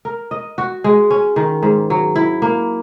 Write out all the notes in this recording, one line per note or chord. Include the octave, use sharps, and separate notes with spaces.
A#4
D#5
F#4
G#3
C#4
D#3
G#2
F#3
E4
A#3